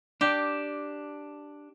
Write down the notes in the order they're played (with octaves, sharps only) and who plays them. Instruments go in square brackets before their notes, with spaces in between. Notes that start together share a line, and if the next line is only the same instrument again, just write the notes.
[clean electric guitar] D4 [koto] G4